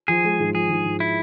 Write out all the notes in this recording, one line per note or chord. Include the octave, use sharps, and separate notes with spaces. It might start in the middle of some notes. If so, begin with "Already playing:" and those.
F3 G#4
G#3
G#2
F3 G#4
G#2
G#2
E4